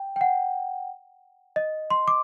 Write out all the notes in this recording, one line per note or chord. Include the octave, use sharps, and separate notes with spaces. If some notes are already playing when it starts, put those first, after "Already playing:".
Already playing: G5
G5
F#5
D#5
C6
D6